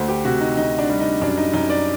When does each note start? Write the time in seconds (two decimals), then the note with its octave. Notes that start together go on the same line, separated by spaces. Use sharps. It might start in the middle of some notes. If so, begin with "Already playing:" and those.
Already playing: D2 C5
0.09 G4
0.25 C3 F#4
0.40 D#4
0.57 D2 D#4
0.79 D4
0.90 G3
1.00 D#4
1.21 F#2 D4
1.37 D#4
1.53 F#2 D#4
1.70 D5